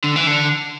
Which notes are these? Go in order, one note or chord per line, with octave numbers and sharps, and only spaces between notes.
D3
E3
D3